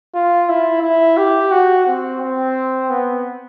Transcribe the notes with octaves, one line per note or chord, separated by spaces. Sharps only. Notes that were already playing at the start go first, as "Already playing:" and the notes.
F4
E4
E4
G4
F#4
C4
C4
B3